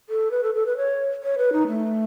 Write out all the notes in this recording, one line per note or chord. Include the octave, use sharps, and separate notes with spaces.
A4
B4
A4
A4
B4
C#5
C#5
B4
D#4
A3